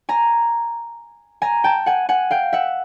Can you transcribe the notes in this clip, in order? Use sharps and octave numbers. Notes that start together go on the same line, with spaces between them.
G#5 A#5
G#5 A#5
G5 A5
F#5 G#5
F#5 G#5
F5 G5
E5 F#5